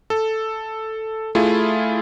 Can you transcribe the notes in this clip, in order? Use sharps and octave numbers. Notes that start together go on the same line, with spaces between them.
A4
A3 E4 F4 G#4